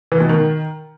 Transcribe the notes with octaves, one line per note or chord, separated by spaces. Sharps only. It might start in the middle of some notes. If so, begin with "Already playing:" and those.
E3
B2
D#3